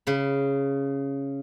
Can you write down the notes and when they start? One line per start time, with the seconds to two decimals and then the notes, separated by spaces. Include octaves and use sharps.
0.07 C#3 B5